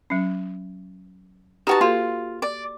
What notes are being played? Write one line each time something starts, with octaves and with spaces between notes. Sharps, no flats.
F#3 C#4
D#4 F#4 G4 B4 A5
A#3 F4 F#4 A4
D5